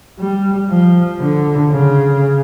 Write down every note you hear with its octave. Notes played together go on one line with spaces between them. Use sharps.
G3
F3
D3
C#3